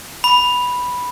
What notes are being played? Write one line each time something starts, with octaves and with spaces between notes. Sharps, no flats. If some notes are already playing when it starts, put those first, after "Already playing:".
B5